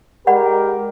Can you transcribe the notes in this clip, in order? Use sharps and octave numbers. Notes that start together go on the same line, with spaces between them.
G#3 G4 A#4 D5 F#5 B5